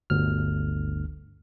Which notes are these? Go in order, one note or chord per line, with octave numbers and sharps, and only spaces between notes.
G1 D2 F6